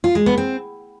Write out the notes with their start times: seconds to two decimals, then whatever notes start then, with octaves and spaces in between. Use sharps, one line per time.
0.04 F4
0.15 G#3
0.26 B3
0.38 C4